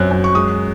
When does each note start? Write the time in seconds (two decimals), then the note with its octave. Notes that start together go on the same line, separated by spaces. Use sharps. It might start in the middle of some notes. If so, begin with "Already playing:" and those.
Already playing: F#2 F#3 C4 F#6
0.11 F#2
0.24 C#6
0.35 G#3 D#6